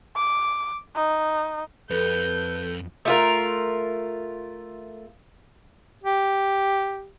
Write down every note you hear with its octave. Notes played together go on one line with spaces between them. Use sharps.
D6
D#4
F2 A4 B4 G6
A3 F4 A#4
G4